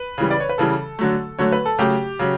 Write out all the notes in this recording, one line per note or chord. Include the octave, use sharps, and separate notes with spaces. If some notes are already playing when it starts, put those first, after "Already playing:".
Already playing: B4
C#3 E3 G3
D5
C#5
B4
C#3 E3 G3 A4
D3 F#3 A3
D3 F#3 A3 C#5
B4
A4
C#3 F#3 A3 G4
C#3 F#3